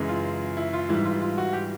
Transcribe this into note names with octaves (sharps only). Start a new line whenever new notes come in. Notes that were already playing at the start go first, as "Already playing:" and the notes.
Already playing: F#2 C#3 E3 G#3
F4
E4
F4
G#2 E3 G3 E4
F4
F4
F#4
G4